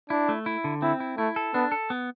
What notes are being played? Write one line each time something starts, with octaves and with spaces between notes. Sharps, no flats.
D4 E4
A3
E4
D3
C4 E4
E4
A3 E4
A4
B3 D4
A4
B3